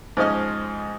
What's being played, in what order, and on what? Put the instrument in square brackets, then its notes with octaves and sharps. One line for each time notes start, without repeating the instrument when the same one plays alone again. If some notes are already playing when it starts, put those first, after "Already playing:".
[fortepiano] G#2 F3 C#4 D#5 F6